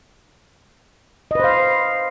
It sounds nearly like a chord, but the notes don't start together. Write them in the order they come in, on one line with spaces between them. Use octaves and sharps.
D#5 B4 C5 F5